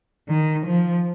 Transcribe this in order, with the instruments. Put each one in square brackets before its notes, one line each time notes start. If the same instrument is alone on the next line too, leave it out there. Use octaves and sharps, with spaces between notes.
[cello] D#3
F3